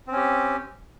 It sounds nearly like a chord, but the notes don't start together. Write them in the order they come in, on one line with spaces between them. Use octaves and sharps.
C4 C#4 G4